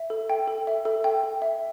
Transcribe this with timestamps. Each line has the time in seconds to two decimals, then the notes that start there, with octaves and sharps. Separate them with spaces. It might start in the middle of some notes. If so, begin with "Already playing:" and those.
Already playing: E5
0.10 A4
0.30 G5
0.48 A4
0.67 E5
0.85 A4
1.04 G5
1.23 A4
1.42 E5